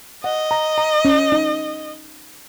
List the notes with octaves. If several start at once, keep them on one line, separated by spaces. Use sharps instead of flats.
D#5 F#5
A#5
A#5
C#4
D#4